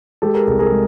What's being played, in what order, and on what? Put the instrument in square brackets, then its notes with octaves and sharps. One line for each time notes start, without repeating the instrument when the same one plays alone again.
[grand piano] G#3 G4 A4
G#4 A#4
C2 G#4
G#4 A#4
G#3